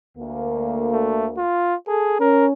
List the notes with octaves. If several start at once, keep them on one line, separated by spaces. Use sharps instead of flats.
D2 A#3
A3
F4
G#4 A4
C#4 A#4